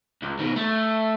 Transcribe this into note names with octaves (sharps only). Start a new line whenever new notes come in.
C#2
B2 D#3
A3